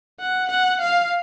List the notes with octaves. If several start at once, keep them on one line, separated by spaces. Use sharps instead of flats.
F#5
F#5
F5